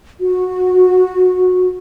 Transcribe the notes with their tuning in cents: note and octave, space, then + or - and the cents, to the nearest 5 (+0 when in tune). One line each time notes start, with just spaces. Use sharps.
F#4 -20